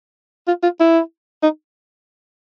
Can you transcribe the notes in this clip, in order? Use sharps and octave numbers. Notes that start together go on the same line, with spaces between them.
F4
F4
E4
D#4